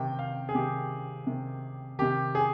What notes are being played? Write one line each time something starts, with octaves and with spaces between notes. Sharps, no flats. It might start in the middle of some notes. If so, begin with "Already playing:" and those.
Already playing: C3 D#3 G5
F5
G#4
C3 D#3 G4
C3 D#3
C3 D#3 G4
G#4